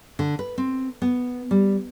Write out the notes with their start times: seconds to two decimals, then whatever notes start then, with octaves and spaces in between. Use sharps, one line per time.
0.19 D3
0.39 B4
0.58 C4
1.02 B3
1.51 G3